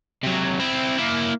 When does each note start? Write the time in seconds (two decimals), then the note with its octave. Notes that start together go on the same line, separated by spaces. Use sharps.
0.23 C3 F#3
0.60 C4 E4
0.98 A#3 E4